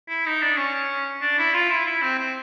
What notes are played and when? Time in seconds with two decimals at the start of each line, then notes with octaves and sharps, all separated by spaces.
0.09 E4
0.26 D#4
0.42 D4
0.57 C#4
1.21 D4
1.38 E4
1.54 F4
1.71 E4
1.86 E4
2.02 C4
2.18 C4